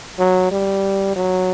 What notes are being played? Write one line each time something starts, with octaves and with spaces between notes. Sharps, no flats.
F#3
G3
F#3